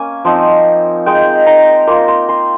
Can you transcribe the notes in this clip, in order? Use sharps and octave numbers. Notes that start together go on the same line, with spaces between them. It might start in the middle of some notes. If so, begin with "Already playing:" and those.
Already playing: A#3 C#4 G#5
F3 C4 D#4
G#3 D#4 G5
A#5
A#3 F4 C6
C6
C6